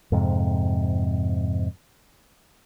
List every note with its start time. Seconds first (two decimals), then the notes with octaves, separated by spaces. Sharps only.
0.12 F2 G#2 C3